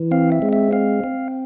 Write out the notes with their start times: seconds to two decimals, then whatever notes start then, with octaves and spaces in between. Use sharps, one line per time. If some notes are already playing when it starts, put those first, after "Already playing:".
Already playing: E3
0.11 C4 F5
0.32 E5
0.42 G#3
0.53 E5
0.72 C4 F5
1.04 C4